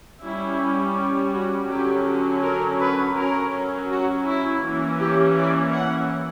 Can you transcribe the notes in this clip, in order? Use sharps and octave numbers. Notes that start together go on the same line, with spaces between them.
G3 C#4 E4
F#4
D3 F#3 C#4 G4
A#4
B4
F#3 C#4 A#4
F#4
E4
E3 A#3 C#4
G4
D5
F#5